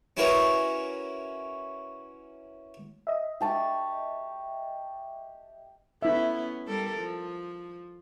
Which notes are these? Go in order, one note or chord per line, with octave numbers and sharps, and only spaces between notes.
C#4 E4 F#4 A#4 B4 C#5
D#5 E5
G4 A5 C#6
B3 C#4 E4 E5
G3 A4 A#4
F3